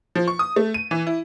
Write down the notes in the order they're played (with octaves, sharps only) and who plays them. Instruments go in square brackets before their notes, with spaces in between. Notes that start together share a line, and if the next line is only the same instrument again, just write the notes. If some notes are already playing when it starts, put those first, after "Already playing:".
[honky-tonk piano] F3
C#6
D#6
A3
D#7
E3
E4